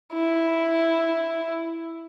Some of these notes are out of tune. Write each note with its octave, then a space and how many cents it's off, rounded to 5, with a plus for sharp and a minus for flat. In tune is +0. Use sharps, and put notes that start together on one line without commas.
E4 +0